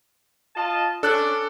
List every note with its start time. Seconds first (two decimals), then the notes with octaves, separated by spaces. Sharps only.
0.55 F4 D#5 A5
1.03 C#4 D4 A4 F#6